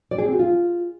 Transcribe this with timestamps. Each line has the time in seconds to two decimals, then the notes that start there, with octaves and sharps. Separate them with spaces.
0.11 D5
0.18 G#4
0.25 C4
0.32 F#4
0.39 F4